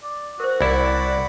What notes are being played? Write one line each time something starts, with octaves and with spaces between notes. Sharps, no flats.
D5
F#4 A#4 C5
C2 E4 D5 F#5 B5